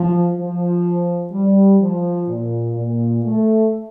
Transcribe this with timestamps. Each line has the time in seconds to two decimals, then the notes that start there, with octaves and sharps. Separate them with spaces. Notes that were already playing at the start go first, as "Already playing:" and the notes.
Already playing: F3
0.36 F3
1.32 G3
1.80 F3
2.28 A#2
2.76 A#2
3.24 A3